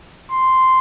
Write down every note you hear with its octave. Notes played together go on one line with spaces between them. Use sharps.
C6